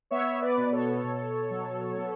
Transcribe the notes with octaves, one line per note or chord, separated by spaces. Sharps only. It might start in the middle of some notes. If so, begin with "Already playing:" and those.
B3 C#5 E5
B4 D5
B2
A4 C#5
B2
F#3
B3